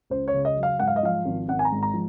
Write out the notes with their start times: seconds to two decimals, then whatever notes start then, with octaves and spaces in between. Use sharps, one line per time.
0.10 C#2 C5
0.28 C#5
0.34 C#3
0.45 D#5
0.57 F#3
0.63 F5
0.79 G#2 F#5
0.87 F5
0.96 D#5
1.03 F3 F5
1.25 G#1
1.48 G#1 F#5
1.59 G#5
1.65 A#5
1.72 G#2
1.83 A#5
1.94 F3